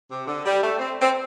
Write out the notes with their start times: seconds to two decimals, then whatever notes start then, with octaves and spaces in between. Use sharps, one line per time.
0.11 C3
0.28 D3
0.45 G3
0.62 A3
0.79 C4
1.01 C4